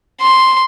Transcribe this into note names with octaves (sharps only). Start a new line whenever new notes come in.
C6